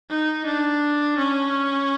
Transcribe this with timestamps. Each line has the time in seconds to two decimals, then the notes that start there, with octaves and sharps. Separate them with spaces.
0.10 D#4
0.46 D4
1.18 C#4